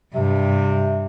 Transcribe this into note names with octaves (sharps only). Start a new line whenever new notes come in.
G2 C3